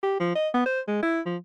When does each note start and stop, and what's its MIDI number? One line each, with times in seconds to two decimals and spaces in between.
0.03 0.15 67
0.20 0.33 53
0.35 0.48 75
0.54 0.64 59
0.66 0.80 72
0.87 1.02 56
1.03 1.20 64
1.26 1.36 53